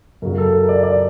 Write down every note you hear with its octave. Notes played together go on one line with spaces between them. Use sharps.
F#2 C#3 F#3 A#4
A4
A#4
D5
D5